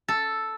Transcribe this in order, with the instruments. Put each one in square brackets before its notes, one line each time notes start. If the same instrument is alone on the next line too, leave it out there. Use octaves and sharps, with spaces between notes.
[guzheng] A4